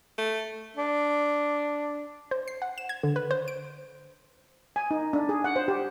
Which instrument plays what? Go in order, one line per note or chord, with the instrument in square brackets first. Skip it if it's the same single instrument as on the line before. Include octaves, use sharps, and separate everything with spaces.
[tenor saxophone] A3
D4
[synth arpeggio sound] C5
C7
F#5
E7
G#6
D3
B4
C5
D7
[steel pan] G#5
D#4
D4
G#4
F#5
C5
G4